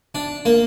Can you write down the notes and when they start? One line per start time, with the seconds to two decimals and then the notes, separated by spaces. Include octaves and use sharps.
0.15 D4
0.45 A#3